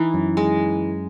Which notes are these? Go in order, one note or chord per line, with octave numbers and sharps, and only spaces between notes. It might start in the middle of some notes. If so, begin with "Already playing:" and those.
Already playing: E3 D#4
F#2
G#3